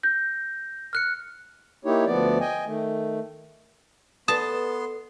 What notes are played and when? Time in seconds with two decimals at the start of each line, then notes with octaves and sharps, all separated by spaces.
0.03 G6 A#6
0.93 F6 F#6 C#7
1.85 A#3 D#4 E4 G4 C#5
2.06 D2 F3 B3 D5
2.40 D#5 G5 G#5
2.65 D#3 A3
4.28 B3 A4 B4 D5 A5 C6 D#6